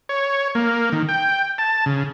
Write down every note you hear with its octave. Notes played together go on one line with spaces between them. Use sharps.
C#5
A#3
D#3
G5
A5
C#3